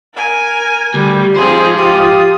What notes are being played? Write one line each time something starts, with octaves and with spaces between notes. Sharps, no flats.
A#4 G#5
D2 G3
G#2 F3 C4 G#4 C5
F4 G4 D#6